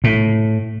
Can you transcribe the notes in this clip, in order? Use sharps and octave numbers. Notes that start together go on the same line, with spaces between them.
A2